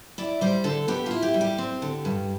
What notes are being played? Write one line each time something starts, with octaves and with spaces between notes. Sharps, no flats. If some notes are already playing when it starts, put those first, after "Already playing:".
E4 D5
G3 C5
D3 A4
B3 G4
E4 F4
G4
G3
G4
C4
D3
G2